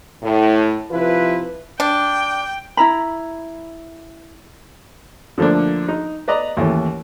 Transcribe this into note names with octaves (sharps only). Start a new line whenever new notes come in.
A2
C3 F3 E4 F4 B4
D4 G5
E4 A#5 B5
D3 F3 A3 A#3 D4
D#4
B4 D5 D#5 A#5
D#2 E3 A3 C#4